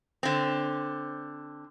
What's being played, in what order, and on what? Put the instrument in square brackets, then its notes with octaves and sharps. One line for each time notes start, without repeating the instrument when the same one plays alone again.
[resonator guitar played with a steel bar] D3 C4